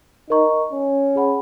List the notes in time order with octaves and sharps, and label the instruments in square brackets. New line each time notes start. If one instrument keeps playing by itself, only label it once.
[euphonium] D#4 [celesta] A#4 D#5 A#5 C#6
[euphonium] C#4
[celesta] G#4 C#5 F#5 B5